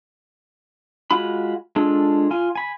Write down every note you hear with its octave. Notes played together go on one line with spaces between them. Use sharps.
G#3 F4 F#4 B5
G#3 D4 F4 A4
F4 G#5
G#5 B5